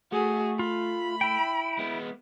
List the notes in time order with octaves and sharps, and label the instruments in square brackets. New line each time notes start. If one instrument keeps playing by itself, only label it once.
[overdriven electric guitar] A3 [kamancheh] F#4 G#4
[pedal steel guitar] F4 [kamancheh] B5
[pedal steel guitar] E4 G5
[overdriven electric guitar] G#3 B3